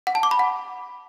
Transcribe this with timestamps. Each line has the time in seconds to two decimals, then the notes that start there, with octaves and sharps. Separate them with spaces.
0.07 F#5
0.15 A5
0.23 D6
0.31 B5
0.39 F#5